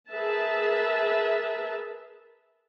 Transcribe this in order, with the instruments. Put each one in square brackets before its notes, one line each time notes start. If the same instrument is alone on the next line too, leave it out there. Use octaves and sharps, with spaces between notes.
[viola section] G#4 A#4 B4 E5 A5